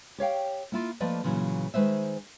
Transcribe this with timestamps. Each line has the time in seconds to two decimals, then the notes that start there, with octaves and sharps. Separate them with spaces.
0.18 G4 C#5 F5 G5
0.72 A#3 E4 F4
1.00 F3 A3 A#3 B4 D5 D#5
1.24 A#2 C#3 E3 F#3
1.74 D#3 G#3 B4 C5 E5